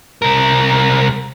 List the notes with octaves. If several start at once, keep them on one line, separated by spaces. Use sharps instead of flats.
C2 A#4